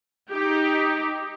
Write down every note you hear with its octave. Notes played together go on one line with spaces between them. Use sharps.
D#4 G4